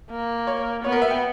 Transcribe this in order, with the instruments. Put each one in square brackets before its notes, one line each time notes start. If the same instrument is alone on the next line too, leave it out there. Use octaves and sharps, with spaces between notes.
[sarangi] A#3
[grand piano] C#5
[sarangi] B3 [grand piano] C#5
[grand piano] A#4
E5
G5